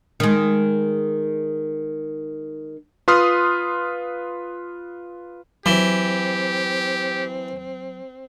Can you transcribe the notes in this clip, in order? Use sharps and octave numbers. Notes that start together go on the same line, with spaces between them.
D#3 G#3
F4 B4 C6 D#6 F6
E3 F#3 C4 G4